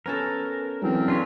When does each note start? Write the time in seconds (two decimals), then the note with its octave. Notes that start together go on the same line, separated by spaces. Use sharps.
0.06 B3 C#4 A4 A#4
0.82 E2 E3 F#3 C4 C#4
1.08 D4 F4 C#5 C6 B6